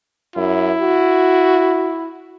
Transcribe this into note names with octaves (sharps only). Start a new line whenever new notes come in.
F#2 E4
F#4